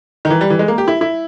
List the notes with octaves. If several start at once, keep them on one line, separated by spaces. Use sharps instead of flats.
D#3
E3
G3
E3
G#3
A#3
G4
E4
E4